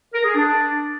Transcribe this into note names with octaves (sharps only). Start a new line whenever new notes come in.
A#4
G#4
D4